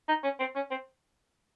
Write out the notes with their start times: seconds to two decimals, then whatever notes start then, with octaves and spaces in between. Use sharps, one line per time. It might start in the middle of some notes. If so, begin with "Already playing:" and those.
0.08 D#4
0.24 C#4
0.40 C4
0.56 C#4
0.71 C4